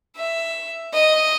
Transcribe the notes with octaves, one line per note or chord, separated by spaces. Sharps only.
E5
D#5